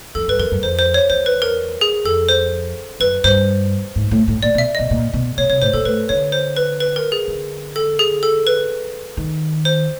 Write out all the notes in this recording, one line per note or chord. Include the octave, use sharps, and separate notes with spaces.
F2 A4
G2 B4
F2 A#4
F#2
F2 C5
C5
C#5
E2 C5
B4
A#4
G#4
F2 A4
C5
F#2 B4
G2 C5
G#2
A2
A2
A#2 D5
B2
E5
B2 D#5
A#2
B2
B2 C#5
C3 C#5
A2 C5
A#2 A4
A2 B4
D3 C#5
C5
B4
B4
A#4
G#4
D3
A4
G#4
A4
B4
D#3
C5